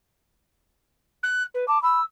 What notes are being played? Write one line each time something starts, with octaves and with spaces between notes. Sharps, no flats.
F#6
B4
A5 D6
B5 E6